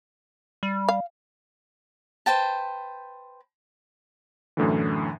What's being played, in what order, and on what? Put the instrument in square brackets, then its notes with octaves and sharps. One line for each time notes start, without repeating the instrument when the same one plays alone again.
[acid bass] G3
[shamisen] F5
[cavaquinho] B4 C5 G5 A5
[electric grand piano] F#2 A2 D3 E3